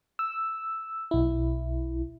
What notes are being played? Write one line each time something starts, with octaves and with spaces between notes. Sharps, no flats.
E6
B1 E4